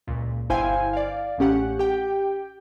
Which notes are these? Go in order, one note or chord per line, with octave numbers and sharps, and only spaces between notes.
C#2 A#2
G1 E4 C5 F5 G5 G#5
D5 F5
A1 A2 C#4 G4 F#5
G4 G5